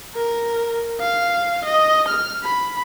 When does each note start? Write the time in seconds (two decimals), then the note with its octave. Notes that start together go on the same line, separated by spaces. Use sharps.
0.15 A#4
1.01 F5
1.65 D#5
2.08 F6
2.43 B5